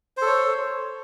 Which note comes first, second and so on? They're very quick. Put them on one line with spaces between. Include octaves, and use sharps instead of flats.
C5 A4 C#5